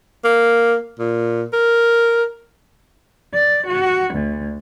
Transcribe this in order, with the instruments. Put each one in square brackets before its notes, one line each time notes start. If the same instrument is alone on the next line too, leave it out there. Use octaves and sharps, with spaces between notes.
[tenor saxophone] A#3
A#2
A#4
[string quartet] D5
F#4
D2